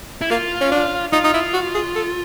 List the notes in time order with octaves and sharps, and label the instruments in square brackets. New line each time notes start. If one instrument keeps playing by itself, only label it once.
[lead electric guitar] E4
[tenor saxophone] A#3 [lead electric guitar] F4
[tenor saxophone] C#4
D4
[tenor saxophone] D#4 [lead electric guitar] F4
[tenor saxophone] D#4
E4
F#4
G#4
A4